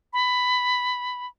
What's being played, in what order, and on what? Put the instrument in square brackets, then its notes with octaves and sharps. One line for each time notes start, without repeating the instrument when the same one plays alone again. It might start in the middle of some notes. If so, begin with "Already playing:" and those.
[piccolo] B5